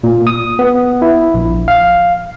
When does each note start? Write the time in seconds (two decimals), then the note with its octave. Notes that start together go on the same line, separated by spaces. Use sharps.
0.04 A#2
0.27 D#6
0.59 B3
1.02 E4
1.34 A#1
1.68 F5